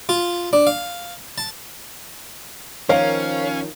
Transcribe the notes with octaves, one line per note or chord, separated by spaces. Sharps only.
F4
D4
F5
A5
D#3 F3 A#3 C#4 A#4 C5 C#5 F5